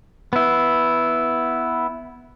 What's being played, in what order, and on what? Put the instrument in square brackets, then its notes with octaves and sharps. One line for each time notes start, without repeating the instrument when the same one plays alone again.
[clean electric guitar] B3 E4